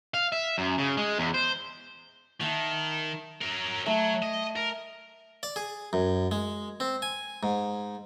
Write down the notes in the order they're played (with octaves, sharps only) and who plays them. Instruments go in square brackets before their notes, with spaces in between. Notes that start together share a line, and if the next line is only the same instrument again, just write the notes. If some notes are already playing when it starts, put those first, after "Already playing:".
[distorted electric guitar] F5
E5
F#2
C#3
G#3
E2
C5
[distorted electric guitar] D#3 [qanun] E5 F#5 A5
[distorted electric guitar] F#3 A#4
[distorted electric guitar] F#3 [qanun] A3
[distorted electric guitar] D#5
A#4
[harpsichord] D5
G#4
F#2
G#3
C4
G#5
G#2